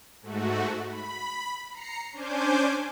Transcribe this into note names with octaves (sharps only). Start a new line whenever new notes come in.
G#2 A3 F#4
B5
A#5 C7 C#7
C#4 D4 C5 G#5 D6 G6